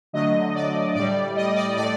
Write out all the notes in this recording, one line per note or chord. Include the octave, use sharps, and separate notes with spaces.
D3 F#3 A3 D#5
D5
A2 G3 D5
D#5
D5
A2 A3 D5